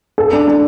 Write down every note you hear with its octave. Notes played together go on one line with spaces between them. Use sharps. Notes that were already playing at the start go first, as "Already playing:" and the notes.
A4
D4
D4